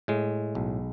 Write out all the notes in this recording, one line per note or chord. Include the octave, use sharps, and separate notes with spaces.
A2 G#3
B1